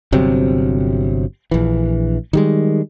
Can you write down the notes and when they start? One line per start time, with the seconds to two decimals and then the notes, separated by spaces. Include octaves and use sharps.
0.12 G1 C3 F#3 C4
1.51 A#1 E3
2.33 D#3 G3 G#3